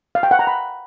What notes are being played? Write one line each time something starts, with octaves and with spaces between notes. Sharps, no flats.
F5
G5
F#5
A#5
B5